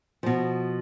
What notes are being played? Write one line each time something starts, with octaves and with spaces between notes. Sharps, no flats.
B2 F3